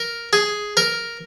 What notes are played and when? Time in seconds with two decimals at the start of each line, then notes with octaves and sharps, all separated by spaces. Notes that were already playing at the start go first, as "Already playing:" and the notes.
Already playing: A#4
0.33 G#4
0.77 A#4